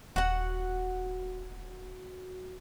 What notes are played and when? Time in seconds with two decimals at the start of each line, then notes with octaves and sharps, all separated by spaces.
0.16 D#1 F#4 F#5